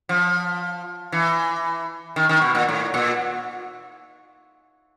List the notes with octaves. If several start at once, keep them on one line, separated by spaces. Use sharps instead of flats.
F3
E3
D#3
D#3
B2
A#2
A2
A#2